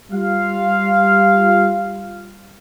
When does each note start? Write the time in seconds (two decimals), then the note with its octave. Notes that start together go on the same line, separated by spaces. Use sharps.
0.10 G3 F4 F5